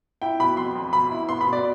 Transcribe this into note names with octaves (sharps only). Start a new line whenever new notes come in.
E4 G5
B2 B5
F2 C6
F2
B2 B5
E4
B3 C6
B5
B2
D5